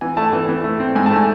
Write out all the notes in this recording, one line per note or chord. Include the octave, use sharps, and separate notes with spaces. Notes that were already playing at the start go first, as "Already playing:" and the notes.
E3 G#5
A3 A5
E3
E3
A3
C4
G#2 G#5
A5
A3 G#5